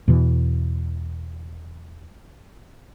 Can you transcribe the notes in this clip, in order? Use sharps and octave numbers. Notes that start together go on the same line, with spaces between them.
E2 B2 E3